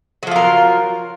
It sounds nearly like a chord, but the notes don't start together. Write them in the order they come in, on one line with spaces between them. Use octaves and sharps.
F#3 F3 F4 A#4